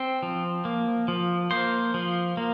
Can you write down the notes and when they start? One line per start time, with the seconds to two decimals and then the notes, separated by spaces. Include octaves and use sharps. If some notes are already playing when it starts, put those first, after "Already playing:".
Already playing: C4 C5
0.23 F3
0.65 A#3
1.08 F3
1.51 A#3 C5
1.94 F3
2.37 A#3